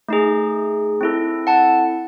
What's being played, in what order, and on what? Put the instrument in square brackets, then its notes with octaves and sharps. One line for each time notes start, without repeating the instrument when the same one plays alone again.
[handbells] A3 D#4 G#4
C4 E4 A4
F#5 A5